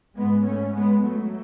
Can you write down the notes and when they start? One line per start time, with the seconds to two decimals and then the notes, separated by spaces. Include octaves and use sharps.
0.17 G#2 G#3 B3
0.45 A3 C#4
0.75 G#3 B3
1.03 F#3 A3